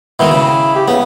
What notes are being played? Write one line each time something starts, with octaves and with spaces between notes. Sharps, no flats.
B2 D#3 G#3 E4
C#3
G4
C#3 B3